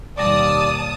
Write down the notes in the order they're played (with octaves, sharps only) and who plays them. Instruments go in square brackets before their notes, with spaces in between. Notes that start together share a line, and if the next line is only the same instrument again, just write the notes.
[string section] D#2 A5 D#6 [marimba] B2 G3 [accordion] D5